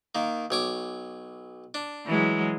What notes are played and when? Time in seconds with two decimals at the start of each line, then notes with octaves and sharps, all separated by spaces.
0.15 D#3 A#3
0.51 B1 C#5 D6
1.74 D4
2.06 E3 F#3 G#3